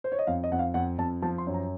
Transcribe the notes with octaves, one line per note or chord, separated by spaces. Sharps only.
C5
C#5
D#5
F2 F5
D#5
F2 F#5
F5
F2 F#5
F2 A5
F3 A5
C6
F#2
A#5